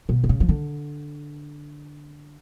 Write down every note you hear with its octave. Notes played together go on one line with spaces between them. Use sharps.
B2
D3
C#3
F3
D3